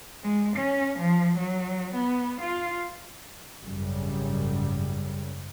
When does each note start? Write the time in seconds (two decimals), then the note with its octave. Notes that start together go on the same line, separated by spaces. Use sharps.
0.23 G#3
0.56 C#4
0.99 F3
1.38 F#3
1.95 B3
2.41 F4
3.60 G#1 F#2 C#3 G3